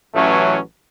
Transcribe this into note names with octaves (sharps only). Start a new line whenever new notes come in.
A1 E3 F#3 A3 C#4